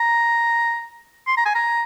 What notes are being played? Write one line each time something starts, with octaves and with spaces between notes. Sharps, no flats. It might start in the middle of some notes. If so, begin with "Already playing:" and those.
Already playing: A#5
C6
A#5
G#5
A#5